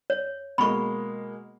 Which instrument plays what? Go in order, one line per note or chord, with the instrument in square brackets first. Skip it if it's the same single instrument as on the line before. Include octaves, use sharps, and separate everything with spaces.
[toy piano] C#5
[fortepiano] B2 G#3 A#3 [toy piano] B5 C#6